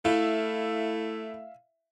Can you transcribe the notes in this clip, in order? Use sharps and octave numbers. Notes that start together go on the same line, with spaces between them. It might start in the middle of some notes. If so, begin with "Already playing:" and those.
A3 E4 E5 F5